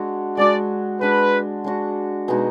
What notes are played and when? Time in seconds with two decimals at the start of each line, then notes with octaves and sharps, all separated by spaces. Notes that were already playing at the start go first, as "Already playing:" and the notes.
Already playing: G#3 D4 F#4
0.37 G#3 D4 F#4 D5
1.01 G#3 D4 F#4 B4
1.64 G#3 D4 F#4
2.28 B2 G#3 D#4 F#4